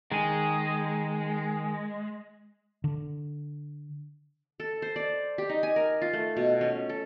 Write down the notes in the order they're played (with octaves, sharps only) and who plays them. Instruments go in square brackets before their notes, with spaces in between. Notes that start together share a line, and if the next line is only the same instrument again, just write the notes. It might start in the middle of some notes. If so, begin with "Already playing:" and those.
[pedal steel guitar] D#3 G#4 [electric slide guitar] G#3
[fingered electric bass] D3
[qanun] A4
C5
D5
G4
D#4
G#5
A#4
F4
A3
B2
C#4
A4